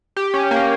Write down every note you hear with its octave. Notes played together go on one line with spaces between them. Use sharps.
G4
C#4
A#3